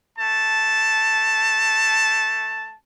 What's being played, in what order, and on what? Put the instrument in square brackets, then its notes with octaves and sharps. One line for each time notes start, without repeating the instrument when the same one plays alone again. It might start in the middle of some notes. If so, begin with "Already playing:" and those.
[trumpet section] A3 A5